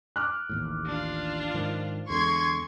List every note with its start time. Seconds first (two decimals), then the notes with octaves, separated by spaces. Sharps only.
0.16 D6 F6 F#6
0.49 A1 D#2 A2
0.85 D4 F4
1.54 G#2 D#3 F3
2.10 E2 D3 G#3 A4 C6 C#6 G#6